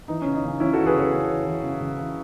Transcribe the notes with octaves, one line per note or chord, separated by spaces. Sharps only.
E3 D#4
C#3 C#4
D#4
C#3 C#4
E3 C#4 E4
E3 F#4 A4
G#4 B4
C#3 A4 C#5
C#3
E3
E3
C#3
C#3
E3